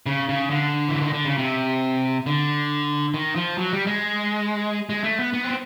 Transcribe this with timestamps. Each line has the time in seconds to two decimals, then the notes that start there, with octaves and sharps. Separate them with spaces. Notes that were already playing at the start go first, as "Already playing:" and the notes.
0.06 C#3
0.29 C#3
0.50 D3
0.89 E3
1.01 D#3
1.13 D3
1.25 C#3
1.38 C3
2.26 D3
3.14 D#3
3.36 F3
3.58 F#3
3.73 G3
3.87 G#3
4.89 G#3
5.04 A3
5.19 B3
5.34 B3
5.44 C4